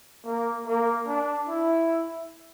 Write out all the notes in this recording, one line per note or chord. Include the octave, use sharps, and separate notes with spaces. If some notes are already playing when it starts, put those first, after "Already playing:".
A#3
A#3
D4
E4